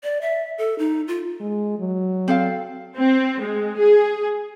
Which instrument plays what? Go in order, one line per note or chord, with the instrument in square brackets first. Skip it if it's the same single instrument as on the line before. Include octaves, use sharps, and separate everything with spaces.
[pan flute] D5
E5
A4
D#4
F4
[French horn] G#3
F#3
[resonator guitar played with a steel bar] C4 A4 F5
[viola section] C4
G#3
G#4